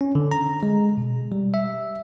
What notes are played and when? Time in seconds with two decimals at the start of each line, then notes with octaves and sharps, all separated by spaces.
0.01 C#4
0.15 D3
0.31 A#5
0.63 G#3
0.98 B2
1.32 G3
1.54 E5